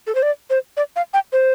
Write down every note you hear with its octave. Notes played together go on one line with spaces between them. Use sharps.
A4
C5
D5
C5
D5
F5
G5
C5